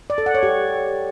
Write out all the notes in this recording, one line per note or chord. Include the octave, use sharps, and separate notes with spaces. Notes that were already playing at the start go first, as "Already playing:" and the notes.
D5
A4
F#5
C#5
G4